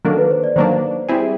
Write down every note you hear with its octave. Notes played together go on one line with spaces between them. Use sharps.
D#3 F#3 A#3 D4 A4
B4
C5
D5
D#3 F#3 A#3 D4 C5
G3 C4 E4 G#4